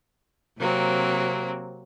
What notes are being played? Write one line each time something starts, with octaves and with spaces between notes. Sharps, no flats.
C3 F#3 A#3 C4